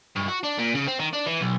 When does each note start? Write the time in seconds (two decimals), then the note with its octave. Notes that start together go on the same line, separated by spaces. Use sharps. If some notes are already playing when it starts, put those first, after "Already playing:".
0.16 G2
0.28 F#4
0.43 D4
0.58 A#2
0.75 C#3
0.87 C4
1.00 D#3
1.13 D4
1.26 E3
1.41 B1